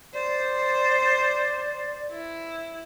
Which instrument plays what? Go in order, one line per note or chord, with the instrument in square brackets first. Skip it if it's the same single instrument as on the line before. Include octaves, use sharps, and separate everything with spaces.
[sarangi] C5 [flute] D5
[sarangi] E4